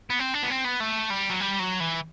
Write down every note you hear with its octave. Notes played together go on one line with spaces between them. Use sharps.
B3
C4
D4
B3
C4
B3
A3
G3
F#3
G3
F#3
E3